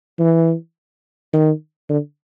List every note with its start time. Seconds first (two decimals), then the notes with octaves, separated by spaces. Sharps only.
0.19 E3
1.33 D#3
1.90 D3